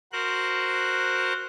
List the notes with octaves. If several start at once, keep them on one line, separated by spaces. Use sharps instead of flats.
F#4 A#4 C5 F#6